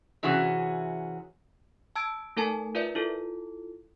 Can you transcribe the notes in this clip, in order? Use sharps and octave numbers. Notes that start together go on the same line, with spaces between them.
C3 E3 C#4 F#4 G#4
A5 E6 G#6 D7
A3 D#4 A4 A#4 G#5 A5
F4 A#4 B4 D5 E5
E4 F4 A4